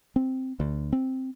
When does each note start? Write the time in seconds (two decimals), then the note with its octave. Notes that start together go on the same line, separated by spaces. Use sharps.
0.16 C4
0.60 D2
0.93 C4